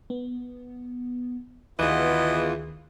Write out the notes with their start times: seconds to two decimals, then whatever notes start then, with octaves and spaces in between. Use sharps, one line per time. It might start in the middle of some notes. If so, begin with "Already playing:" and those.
0.10 B3
1.79 D2 B2 D#3 E3 B3 F4 G#4 D#5